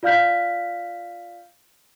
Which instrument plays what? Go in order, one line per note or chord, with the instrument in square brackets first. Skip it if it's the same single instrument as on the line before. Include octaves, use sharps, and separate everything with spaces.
[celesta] F4 D5 F5 F6 G6 B6